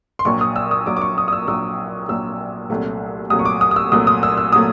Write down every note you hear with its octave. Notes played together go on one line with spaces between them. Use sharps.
C6
A#1 A#2 F#3 C#6
D#6
E6
D#6
A#1 A#2 F#3 D6
D6
C#6
D#6
D#6
E6
A#1 A#2 F#3 E6
A#1 A#2 F#3 E6
C2 A#2 F#3 A3
C2 A#2 F#3 A3 D#6
C#6
D6
D#6
D#6
E6
C2 A#2 F#3 A3 D#6
D#6
E6
E6
A#2 F#3 A3 D#6